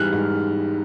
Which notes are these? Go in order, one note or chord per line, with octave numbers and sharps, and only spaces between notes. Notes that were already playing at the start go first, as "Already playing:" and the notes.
Already playing: G#2 E3 G3 F6 F#6
G#2